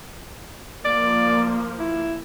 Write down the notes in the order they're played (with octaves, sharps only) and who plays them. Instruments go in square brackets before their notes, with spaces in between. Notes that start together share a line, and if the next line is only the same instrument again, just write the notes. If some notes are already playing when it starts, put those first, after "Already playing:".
[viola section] F3 A#3 [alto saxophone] D5
[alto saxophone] E4